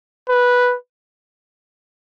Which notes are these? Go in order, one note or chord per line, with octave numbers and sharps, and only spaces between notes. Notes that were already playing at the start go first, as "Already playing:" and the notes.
B4